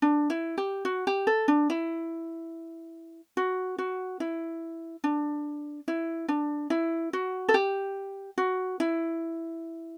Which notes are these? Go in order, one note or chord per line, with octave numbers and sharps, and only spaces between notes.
D4
E4
G4
F#4
G4
A4
D4
E4
F#4
F#4
E4
D4
E4
D4
E4
F#4
A4
G4
F#4
E4